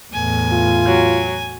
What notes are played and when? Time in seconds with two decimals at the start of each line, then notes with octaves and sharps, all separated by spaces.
0.13 E2 A2 G#5
0.52 F4
0.86 F#3